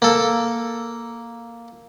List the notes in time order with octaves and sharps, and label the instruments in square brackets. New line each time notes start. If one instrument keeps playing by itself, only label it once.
[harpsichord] A#3 A4